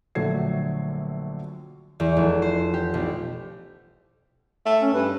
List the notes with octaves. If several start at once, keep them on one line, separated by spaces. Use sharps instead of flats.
A#1 D3 F#3 A3 G#6 C7
E2
F1
C5
G4
B1
A3
C#4
G2 B4